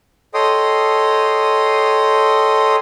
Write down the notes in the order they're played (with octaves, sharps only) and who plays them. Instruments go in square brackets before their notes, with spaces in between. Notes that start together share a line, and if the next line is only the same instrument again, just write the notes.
[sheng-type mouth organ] A4 C#5 D#5 G5 C6 D#6